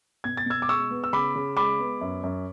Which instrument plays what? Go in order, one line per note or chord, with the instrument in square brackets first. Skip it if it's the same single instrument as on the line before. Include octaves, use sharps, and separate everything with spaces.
[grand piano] B2 G#6
A6
B2 E6 G#6
D6
G#3 C#6 E6
B3
E6
C#3 B5 D6
C#3
G#3 B5 D6
B3
F#2
F#2